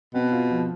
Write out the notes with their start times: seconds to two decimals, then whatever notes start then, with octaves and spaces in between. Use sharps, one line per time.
0.14 B2 C4
0.32 F4
0.51 F3